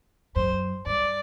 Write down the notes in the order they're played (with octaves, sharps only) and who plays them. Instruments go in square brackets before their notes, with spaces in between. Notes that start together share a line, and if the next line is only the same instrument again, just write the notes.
[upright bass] F#2 [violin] C5
[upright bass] G2 [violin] D5